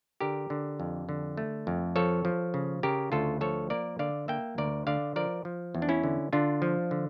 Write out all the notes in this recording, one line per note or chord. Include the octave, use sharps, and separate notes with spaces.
D3 G4 A#4
D3
F2
D3
A3
F2
F3 A4 C#5
F3
C#3
C#3 G4 A#4
D2 F4 A4
F3 A4 C#5
A#3 A#4 D5
D3 D5 F5
A#3 E5 G5
D2 A#4 D5
D3 D5 F5
F3 A#4 D5
F3
E2
D4
C#4 E4
D3
D3 D4 F4
F3
D3